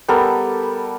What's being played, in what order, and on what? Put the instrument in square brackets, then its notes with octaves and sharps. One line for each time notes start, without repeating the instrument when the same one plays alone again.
[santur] G3 B3 A4 A#4